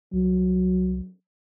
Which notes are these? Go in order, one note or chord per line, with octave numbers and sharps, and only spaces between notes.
C2 F#3